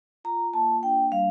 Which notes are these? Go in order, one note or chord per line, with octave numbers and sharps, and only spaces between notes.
F4 A#5
A#3 A5
D4 G5
G3 F5